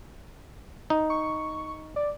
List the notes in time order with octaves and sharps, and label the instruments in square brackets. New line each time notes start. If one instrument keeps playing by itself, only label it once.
[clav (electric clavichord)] D#4
[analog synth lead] C#6
D5